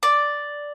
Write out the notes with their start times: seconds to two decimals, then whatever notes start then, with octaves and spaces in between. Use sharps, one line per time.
0.03 D5